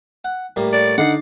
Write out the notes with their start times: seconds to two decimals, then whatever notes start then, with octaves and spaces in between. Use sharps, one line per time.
0.25 F#5
0.56 A2 G3 A#3
0.73 D5
0.98 D3 D#4 D5 F#5 C7